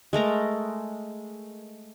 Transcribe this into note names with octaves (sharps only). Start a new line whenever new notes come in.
G#3 A3 A#4 A#5